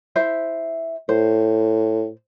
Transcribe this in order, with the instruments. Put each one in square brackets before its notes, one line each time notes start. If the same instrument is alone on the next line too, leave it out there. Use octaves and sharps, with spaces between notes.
[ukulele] E4 C5 E5
[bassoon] A2 [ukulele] C5